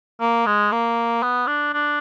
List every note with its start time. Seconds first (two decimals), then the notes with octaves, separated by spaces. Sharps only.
0.21 A#3
0.46 G#3
0.72 A#3
1.23 B3
1.47 D4
1.74 D4